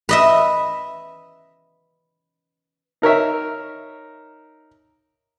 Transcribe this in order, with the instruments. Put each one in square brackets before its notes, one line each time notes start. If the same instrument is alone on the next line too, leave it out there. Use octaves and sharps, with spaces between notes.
[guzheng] B4 D#5 E5
[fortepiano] D#4 A#4 C#5 E5